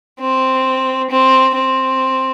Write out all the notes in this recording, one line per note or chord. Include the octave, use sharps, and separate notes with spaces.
C4
C4
C4